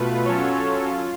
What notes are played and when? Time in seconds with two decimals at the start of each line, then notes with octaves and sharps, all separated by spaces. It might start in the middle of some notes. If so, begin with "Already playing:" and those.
Already playing: B2 A3 F4 B4
0.25 F#3 C#4 F4 A4 C#5
0.86 F4